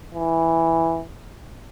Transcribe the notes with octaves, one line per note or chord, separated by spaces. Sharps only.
E3